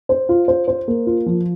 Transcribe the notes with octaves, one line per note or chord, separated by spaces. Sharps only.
C5
F4
C5
C5
A#3
F4
F3